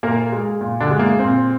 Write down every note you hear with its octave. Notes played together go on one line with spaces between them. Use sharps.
A#2 A#3 A#4
G#3
A#2
D3 D4
G#3
A#3
A#2 C4